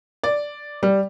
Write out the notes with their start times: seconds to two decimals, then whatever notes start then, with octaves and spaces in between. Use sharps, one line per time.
0.23 D5
0.83 G3